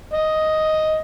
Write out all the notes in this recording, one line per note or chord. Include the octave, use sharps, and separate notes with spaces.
D#5